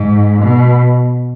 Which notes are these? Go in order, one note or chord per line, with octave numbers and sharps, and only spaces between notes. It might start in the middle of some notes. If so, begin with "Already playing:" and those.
Already playing: G#2
B2